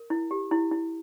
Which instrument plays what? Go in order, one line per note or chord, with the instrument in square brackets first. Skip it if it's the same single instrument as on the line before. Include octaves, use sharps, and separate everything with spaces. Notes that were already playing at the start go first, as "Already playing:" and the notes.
Already playing: [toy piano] A#4
E4
G4
E4
E4